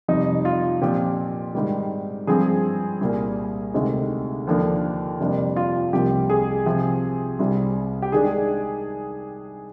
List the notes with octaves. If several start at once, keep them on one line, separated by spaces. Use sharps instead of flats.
F2 C3 G3 D#4
F4
A#2 F3 C4 G4
G#2 D#3 G3
G2 F3 C4 G#4
C2 A#2 G3 A#3
D2 C3 D#3 G#3
D#2 D3 F3 A#3 D4
F2 C3 G3 A#3 D4
F4
C2 C3 F3 A#3 G4
G#4
C3 F3 C4
C2 C3 G3
G4
D#3 G#3 D4 G#4